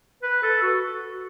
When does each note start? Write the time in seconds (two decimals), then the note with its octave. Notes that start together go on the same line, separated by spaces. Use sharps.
0.23 B4
0.43 A4
0.62 F#4